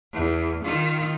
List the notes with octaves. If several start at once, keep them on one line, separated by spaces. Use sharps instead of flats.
E2
D#3 F4